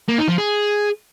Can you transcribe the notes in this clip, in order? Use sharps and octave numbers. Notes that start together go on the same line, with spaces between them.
A#3
D#4
F3
G#4